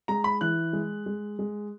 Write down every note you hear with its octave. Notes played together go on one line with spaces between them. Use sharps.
G#3 A#5
B5
E3 F#6
G#3
G#3
G#3